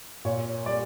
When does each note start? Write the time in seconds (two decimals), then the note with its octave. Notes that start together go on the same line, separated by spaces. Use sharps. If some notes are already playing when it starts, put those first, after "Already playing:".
0.25 A#2 C#5
0.66 G3 D5